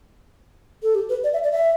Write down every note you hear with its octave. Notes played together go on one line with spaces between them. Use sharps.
A4
G4
B4
D5
E5
D5
E5